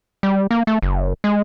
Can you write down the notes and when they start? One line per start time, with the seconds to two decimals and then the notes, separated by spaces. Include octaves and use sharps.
0.23 G3
0.51 A#3
0.67 A3
0.82 F#1
1.24 G#3